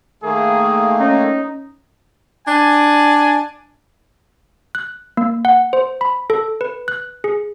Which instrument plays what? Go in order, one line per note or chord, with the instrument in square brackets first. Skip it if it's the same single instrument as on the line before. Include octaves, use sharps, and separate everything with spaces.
[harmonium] D#3 A3 A#3 [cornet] G#4
[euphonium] C#4 [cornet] D#4
[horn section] D4 G#5
[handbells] F#6
A#3
F#5
C5
B5
A4
B4
F#6
G#4